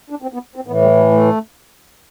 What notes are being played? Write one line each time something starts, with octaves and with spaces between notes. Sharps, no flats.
D4
C4
B3
C4
A2 E3 B3
G3
G3
A3